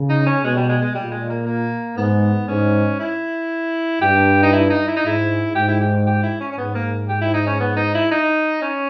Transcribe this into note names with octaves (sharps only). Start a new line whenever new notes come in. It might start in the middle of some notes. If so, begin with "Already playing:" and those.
Already playing: C#3
D#4
C#4
B2 G#3
G3
G#3
G#3
A#2 G3
G#3
A#3
A#3
G#2 B3
G#2 C#4
E4
G2 G4
D#4
E4
D#4
E4
D#4
G#2 E4
G#2 G4
E4
G4
G4
E4
C#4
C#4
G#2 B3
A#3
G4
E4
D#4
C#4
B3
D#4
E4
D#4
C#4